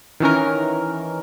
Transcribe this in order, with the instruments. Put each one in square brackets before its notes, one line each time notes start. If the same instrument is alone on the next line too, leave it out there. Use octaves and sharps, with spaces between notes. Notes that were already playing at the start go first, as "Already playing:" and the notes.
[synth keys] D#3 E3 C#4 A#4